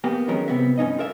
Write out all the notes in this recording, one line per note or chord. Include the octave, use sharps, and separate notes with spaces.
A#3 B3 G4
D#3 F#3 G#3 C#4 A#4
C2 C3 B3 C4 E5
G2 C#4 D#4 D#5
F4 A#4 D5 E5